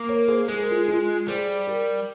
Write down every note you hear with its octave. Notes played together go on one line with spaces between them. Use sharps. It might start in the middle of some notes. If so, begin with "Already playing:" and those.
Already playing: A#3
A#4 C#5
G#4 C5
G#3 G#4
A#4
F4 G#4
F4 G#4
G3 G#4 C5
G4 A#4